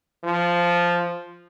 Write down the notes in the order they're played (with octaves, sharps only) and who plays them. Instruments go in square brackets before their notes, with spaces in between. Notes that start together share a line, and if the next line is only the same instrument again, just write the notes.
[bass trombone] F3